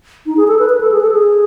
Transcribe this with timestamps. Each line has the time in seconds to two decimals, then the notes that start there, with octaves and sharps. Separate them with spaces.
0.26 D#4
0.37 G#4
0.48 A4
0.59 B4
0.69 B4
0.81 A4
0.91 G#4
1.01 A4
1.11 G#4